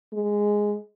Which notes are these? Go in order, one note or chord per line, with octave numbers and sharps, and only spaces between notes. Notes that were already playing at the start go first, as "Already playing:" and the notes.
G#3